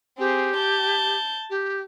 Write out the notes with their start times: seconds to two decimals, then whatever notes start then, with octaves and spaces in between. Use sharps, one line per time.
0.18 C4 G4 G#4
0.56 A5 G6
1.49 G4